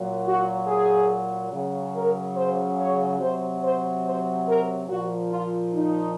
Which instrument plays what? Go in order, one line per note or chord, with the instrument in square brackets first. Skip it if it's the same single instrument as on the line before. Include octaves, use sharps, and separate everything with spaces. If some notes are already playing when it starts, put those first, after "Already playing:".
Already playing: [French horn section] A#2 F#3
F#4
G#4
C#3 F#3
A#4
C5
C#5
C3 F#3 C5
C5
C5
A#4
A#2 F3 F#4
F4
D#4